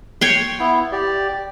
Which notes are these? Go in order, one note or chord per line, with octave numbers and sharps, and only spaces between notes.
C#5 G5 C6
B3 E4
G4 D5